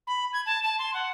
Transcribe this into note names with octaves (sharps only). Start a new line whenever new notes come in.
B5
G#6
A5
A5
C6
F#5